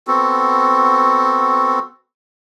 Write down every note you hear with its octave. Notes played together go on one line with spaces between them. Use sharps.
B3 C4 F#4 A4